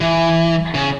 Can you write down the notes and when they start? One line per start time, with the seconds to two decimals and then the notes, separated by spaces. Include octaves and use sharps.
0.01 E3
0.75 C#3